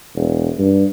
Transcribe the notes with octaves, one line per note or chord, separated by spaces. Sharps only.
E1
G2